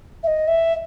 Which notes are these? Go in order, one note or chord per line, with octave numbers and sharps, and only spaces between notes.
E5
D#5
E5